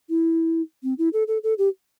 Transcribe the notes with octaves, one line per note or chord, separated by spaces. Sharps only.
E4
C4
E4
A4
A4
A4
G4